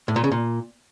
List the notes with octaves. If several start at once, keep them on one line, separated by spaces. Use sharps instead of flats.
A2
A#2
C#3
A#2